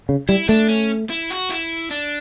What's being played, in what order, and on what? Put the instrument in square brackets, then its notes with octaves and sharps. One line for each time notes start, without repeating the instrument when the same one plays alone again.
[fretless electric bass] C#3
[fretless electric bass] G3 [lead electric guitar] E4
[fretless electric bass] A3 [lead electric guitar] D4
[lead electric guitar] C#4
E4
F#4
E4
D4